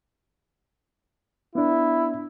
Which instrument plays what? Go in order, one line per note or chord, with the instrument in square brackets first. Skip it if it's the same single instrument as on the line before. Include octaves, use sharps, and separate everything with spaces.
[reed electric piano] B3 D4 [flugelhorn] E4